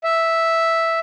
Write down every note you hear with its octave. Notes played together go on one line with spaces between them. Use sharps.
E5